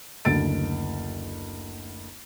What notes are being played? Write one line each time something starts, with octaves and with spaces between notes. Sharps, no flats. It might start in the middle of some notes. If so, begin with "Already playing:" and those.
F#1 D2 A6 D7